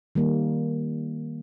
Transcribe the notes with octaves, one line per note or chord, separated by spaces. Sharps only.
D#3 G3 A#3